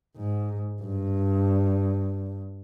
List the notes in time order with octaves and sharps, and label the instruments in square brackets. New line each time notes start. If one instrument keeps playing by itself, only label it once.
[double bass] G#2
G2